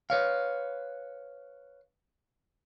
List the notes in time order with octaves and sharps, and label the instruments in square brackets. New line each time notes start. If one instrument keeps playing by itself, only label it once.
[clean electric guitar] B4 C#5 F5